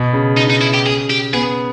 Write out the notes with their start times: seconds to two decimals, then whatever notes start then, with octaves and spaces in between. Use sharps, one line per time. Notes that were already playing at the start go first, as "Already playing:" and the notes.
Already playing: B2
0.13 C#3
0.37 D#4
0.50 D#4
0.61 E4
0.74 G4
0.86 G#4
1.10 G4
1.33 B3 G#4